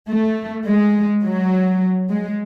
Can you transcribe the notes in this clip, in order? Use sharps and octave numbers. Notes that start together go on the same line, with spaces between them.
A3
G#3
F#3
G#3